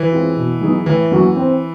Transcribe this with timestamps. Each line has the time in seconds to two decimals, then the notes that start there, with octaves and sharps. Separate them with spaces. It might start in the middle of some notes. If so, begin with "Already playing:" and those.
Already playing: E3
0.12 G#3 C4 F4
0.36 B2
0.61 F#3 B3 D#4 G#4
0.86 A2 E3
1.11 F#3 A#3 C#4 F#4
1.36 C4